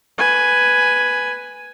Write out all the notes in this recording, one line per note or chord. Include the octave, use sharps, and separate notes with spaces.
B4 G#5